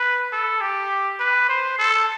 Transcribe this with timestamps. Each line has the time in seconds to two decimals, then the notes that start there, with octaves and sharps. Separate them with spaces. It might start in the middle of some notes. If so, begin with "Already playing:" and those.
Already playing: B4
0.32 A4
0.61 G4
1.19 B4
1.49 C5
1.78 A4